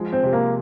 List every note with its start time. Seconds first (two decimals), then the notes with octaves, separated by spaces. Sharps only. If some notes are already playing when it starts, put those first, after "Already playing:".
Already playing: F3 G#3
0.13 C4
0.23 C3
0.33 A#3